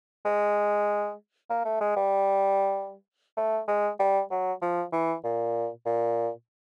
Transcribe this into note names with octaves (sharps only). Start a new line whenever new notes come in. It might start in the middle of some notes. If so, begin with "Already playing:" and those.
G#3
A#3
A3
G#3
G3
A3
G#3
G3
F#3
F3
E3
A#2
A#2